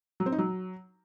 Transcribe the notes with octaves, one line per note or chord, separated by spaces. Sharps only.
F#3
C4
D#4
F#3